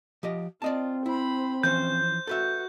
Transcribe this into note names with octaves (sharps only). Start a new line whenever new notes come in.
F3 G4 D#5
C4 F4 D5 D#5 A5
E4 C5 B5
E3 F3 C#4 C5 G6
F#4 A4 B4 E5